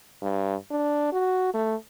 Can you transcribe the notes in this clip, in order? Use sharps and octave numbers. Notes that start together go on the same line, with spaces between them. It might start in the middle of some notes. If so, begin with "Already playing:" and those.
G2
D4
F#4
A3